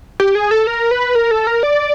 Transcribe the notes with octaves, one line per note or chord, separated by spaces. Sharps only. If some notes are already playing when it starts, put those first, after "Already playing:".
G4
G#4
A4
A#4
B4
A#4
A4
A#4
D5